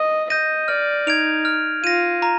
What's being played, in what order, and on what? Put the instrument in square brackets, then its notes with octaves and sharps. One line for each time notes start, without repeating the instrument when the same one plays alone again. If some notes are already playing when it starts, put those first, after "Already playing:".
Already playing: [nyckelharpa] D#5
[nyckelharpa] D#5 [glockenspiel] G6 A#6 D#7
[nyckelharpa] D5 [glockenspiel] F6
[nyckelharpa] D#4 [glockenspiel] G#6 D7 F7
[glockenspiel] F6
[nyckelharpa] F4 [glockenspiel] A#6 D#7
[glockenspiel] A#5